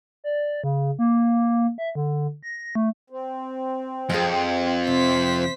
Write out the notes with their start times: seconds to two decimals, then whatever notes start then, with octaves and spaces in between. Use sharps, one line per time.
0.24 D5
0.64 C#3
0.99 A#3
1.78 E5
1.95 D3
2.43 A#6
2.75 A3
3.10 C4
4.10 F2 G#4 F5 G5
4.87 C3 C5 B6